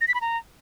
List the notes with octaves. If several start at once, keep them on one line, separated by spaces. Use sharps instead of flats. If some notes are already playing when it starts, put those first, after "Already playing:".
A#6
B6
B5
A#5